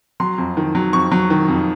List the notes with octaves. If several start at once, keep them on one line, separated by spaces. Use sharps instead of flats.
F#3 C6
F2
D#3
F#3
F2 C#6
F#3
D#3
F2